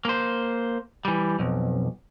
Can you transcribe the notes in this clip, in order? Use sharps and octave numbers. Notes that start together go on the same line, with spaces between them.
A#3 C5
E3 G3
B1 F2